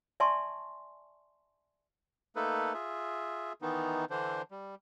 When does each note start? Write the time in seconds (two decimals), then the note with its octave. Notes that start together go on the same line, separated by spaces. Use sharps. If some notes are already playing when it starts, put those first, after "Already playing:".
0.20 D5 E5 G#5 A5 C6 C#6
2.36 A3 A#3 D#4 A4 B4
2.74 F4 G#4 E5
3.62 D#3 E3 B3 D#4
4.10 D3 E3 D4 C5
4.51 G3